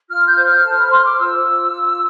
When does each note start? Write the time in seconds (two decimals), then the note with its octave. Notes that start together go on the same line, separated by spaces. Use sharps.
0.09 F4 F6
0.27 G6
0.36 C5
0.46 F6
0.63 A4 A5
0.78 B5
0.90 C5 C6
1.03 D6
1.17 F4 E6
1.44 F4
1.71 F4